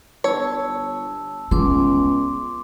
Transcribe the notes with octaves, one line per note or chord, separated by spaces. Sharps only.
G1 C#5 A5 E6
C#2 B3 C6 D6